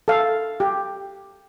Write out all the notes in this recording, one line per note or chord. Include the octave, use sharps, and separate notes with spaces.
A4 F5
G4